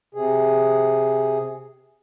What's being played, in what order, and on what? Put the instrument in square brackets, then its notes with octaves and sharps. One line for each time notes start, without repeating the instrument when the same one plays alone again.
[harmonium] C3 G#4